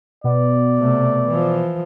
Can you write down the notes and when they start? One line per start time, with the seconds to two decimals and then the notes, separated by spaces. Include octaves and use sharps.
0.24 B2 B3 D5
0.78 C3 A3
1.28 E3 F3